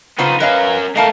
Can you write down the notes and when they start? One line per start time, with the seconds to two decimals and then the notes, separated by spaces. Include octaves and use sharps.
0.19 C#3 B3 D#4 F4 C5
0.40 C#4 A#4 B4 D#5 F5
0.96 A3 A#4 D#5 F5 A5